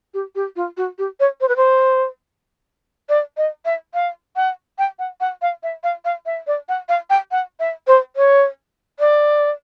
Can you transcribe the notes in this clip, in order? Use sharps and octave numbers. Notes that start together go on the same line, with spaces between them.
G4
G4
F4
F#4
G4
C#5
C5
B4
C5
D5
D#5
E5
F5
F#5
G5
F#5
F#5
F5
E5
F5
F5
E5
D5
F#5
F5
G5
F#5
E5
C5
C#5
D5